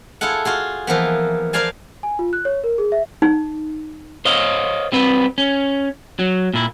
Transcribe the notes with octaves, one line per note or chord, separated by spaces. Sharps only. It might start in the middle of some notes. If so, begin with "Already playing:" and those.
E4 F4 G#4 A4 F#5
F4 F#4 G#4
E3 F3 A#3 B3
A#4 C5 D5 F5 G#5 A5
G#5
F4
F#6
C#5
A#4
G#4
E5
D#4
C5 C#5 D#5 F5
G3 C4 B4
C#4
F#3
A#2 E4